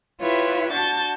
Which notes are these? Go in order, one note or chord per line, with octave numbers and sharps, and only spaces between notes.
E4 F4 G4 B4 C#5 E5
D4 F#4 A5 G6 A6